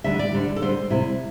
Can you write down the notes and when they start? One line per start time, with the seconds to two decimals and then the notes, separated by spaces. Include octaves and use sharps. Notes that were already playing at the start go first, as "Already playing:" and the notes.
0.04 D2 D3 G3 E5
0.19 D5
0.33 D2 D3 G3
0.56 A4
0.61 D2 D3 G3 C5
0.90 D2 C3 G3 E4